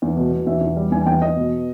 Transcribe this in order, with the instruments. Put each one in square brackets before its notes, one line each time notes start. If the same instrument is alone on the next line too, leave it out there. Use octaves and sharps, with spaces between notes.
[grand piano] E2
B2
B2
E2 E5
E2
G3
E2 G#5
G#5
E2 G5
E2 D#5
B2